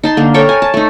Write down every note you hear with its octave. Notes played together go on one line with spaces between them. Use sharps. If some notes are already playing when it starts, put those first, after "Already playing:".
D#4 A5 C6
D3 A#3
A4 A#4 C#5 G5
G#5
A5
A3 D#4